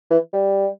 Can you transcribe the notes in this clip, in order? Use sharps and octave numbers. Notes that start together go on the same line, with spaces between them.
E3
G3